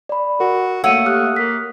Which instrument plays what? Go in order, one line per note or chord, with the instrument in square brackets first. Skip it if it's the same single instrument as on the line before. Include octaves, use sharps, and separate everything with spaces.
[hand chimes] D5 B5
[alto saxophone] F#4 [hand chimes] A#4
[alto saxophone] A3 [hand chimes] A#3 F5 [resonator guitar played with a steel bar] C#5 F#5 [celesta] E6 C#7 D#7
[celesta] G4 [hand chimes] D#6 F6 F#6
[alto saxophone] A#3 [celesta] B6